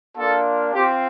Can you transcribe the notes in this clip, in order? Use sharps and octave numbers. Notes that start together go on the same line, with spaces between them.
A#3 D4 F4 A4
C4 F4 G4